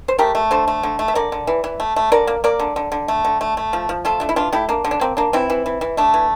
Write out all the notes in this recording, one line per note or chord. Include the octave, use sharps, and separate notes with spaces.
C5
A3 G4 A#4
A3
D3 A4 C5
A3
D3
A3
E5
D3 A#4 D5
D3
E3
E3
A3
A3
D3 A#4 D5
A#3
A#3 A#4 D5
D3
D3
D3
A3
D3
A3
A3
F3
F3
A3 F4 A4
A3 D4
E4
E3 D4 F4
A3 E4 G4
A#3 D4
D3
D4
A#3 C4
A#3 D4
E3 C4 E4
E3
E3
E3
A3 D4
E3